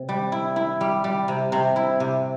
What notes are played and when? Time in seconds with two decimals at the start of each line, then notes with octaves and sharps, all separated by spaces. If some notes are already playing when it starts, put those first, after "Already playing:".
Already playing: C3
0.09 G3
0.32 E4
0.56 E4
0.81 G3
1.04 G3
1.28 C3
1.52 C3
1.76 E4
2.00 C3